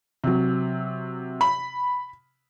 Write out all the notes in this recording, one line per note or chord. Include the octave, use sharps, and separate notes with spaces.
C3 F#3
B5